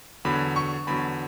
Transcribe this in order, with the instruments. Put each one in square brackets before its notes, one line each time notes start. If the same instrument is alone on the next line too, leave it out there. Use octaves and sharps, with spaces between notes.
[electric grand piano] E2 D3 F#3 [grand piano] B5
[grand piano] C#6
[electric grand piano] E2 D3 F#3 [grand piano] B5